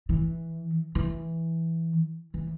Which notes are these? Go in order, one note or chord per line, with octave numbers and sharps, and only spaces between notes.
E3
E3
E3